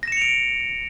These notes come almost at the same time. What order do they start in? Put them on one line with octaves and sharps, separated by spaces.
A#6 E7 C#7 F7 D7